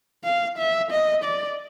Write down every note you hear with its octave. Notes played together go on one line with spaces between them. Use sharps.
F5
E5
D#5
D5